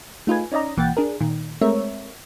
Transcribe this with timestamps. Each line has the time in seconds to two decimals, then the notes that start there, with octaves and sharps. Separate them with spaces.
0.27 A3 D#4 F4 G#4 B4 G#5
0.52 C#4 D#4 D5 D#5 A#5
0.77 B1 E3 A#3 F#5 G5 A6
0.97 D4 G#4 A#4
1.21 A#2 D#3
1.61 G#3 A3 C4 A#4 C#5 E5